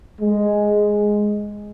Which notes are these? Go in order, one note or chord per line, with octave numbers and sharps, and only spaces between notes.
G#3